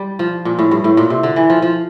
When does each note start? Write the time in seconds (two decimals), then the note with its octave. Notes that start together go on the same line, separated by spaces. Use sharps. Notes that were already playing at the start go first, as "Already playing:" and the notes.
Already playing: G3
0.19 F3
0.45 A#2
0.59 A2
0.71 G2
0.84 A2
0.97 A#2
1.10 C3
1.23 D3
1.36 E3
1.50 F3
1.62 F3